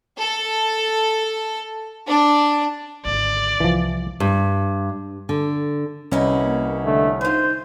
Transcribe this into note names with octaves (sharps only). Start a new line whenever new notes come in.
A4
D4
G#1 D3 D5
C2 E3 F3 F4
G2
D3
C2 B3 C#4 D#4 E4
A#3
D3 A3
D#4 F4 C5 G#5